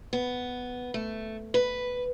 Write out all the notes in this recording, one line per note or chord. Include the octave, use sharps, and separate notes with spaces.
B3
A3
B4